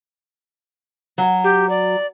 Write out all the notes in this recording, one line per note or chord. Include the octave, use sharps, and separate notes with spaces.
F#3
G4
D5